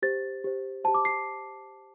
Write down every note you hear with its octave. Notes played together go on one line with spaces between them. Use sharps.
G4 C5 A6
G4 C5
G4 C5 A5
D6
C7